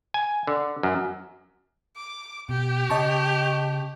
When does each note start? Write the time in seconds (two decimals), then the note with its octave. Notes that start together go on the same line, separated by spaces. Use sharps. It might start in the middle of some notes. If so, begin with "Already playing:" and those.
0.14 G#5
0.47 D3
0.83 F#2
1.96 D6
2.49 B2 G4
2.90 C#3 D#5 A5 C#6